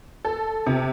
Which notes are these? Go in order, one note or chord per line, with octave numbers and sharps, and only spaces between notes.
A4
C3